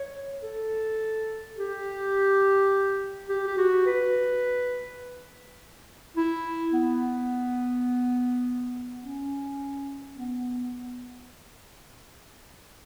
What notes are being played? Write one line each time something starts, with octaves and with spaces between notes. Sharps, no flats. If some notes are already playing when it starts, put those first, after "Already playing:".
Already playing: C#5
A4
G4
G4
G4
F#4
B4
E4
B3
C#4
B3